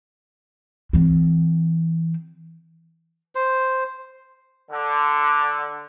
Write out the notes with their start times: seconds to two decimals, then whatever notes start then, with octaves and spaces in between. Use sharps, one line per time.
0.93 E3 C4
3.35 C5
4.71 D3